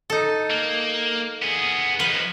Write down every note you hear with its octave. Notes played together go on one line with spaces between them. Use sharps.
D#4 A4
A#3
B3 G#4
F3 D#4 B4